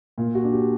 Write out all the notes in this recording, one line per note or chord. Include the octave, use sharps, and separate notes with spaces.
A#2 F4
F#4
D4
G4